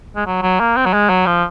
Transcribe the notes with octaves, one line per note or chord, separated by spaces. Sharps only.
G#3
F#3
F#3
A#3
C4
F#3
G#3
F#3
F3